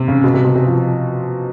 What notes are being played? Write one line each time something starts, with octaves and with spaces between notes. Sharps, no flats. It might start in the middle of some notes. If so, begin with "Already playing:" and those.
Already playing: C3
C#3
B2
C3
B2
C3
F3